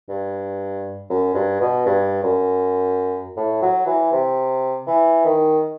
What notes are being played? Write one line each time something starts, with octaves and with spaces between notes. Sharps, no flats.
G2
F#2
G2
B2
G2
F#2
A2
F#3
E3
C3
E3
D#3